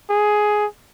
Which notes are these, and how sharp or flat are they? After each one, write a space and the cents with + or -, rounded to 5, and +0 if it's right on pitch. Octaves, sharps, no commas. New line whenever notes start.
G#4 +10